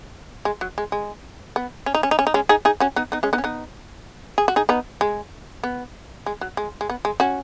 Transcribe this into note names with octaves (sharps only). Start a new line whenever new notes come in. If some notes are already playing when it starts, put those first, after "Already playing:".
G#3
F#3
G#3
G#3
B3
C#4
D#4
C#4
D#4
C#4
D#4
G#3 C#4
D#4 G#4
D#4 G#4
C#4 F#4
B3 D#4
B3 D#4
G#3 C#4
B3 D#4
C#4
B3 D#4
G#4
F#4
D#4 G#4
B3 D#4
G#3
B3
G#3
F#3
G#3
G#3
B3
G#3
C#4 F#4